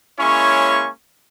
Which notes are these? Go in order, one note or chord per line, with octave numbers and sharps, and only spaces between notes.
G#3 A#3 C#4 E4 C#5 C#6